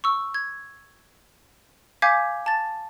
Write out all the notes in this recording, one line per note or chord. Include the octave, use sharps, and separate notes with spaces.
C#6 E6
G#6
F5 G#5 D6 G6 G#6 B6
A5 A6